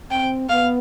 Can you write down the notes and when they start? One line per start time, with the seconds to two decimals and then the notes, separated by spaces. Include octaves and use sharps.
0.10 C4 G5
0.49 B3 F5